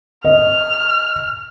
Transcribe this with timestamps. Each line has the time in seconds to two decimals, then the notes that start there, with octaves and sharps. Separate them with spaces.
0.25 D#5 F6